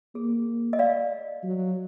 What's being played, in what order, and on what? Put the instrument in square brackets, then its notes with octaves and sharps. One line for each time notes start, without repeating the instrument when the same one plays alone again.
[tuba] A#3 [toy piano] G#4
[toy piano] D#5
D5 F5
[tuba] F#3